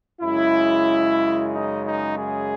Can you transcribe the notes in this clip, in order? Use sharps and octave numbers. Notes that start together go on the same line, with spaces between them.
F#2 C#3 G#3 E4
D#4
D#4
G#4